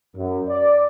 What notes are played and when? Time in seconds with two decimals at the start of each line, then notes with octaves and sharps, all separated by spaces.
0.16 F#2
0.48 D5